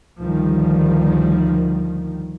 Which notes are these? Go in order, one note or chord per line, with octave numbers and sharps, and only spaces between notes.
D2 D#3 F3 G3